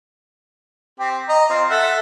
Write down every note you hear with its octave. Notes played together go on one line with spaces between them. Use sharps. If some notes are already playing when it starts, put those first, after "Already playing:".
C4 G4
D#5 A#5
C4 F4
A4 E5 F#5